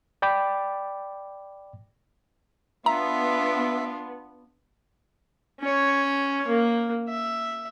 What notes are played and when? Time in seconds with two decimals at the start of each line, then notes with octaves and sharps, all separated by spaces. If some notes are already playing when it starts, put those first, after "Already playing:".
0.22 D5 G5 B5 D6
2.86 B3 D4 F4 E5 A#5
5.60 C#4 C#5
6.48 A#3
7.09 E5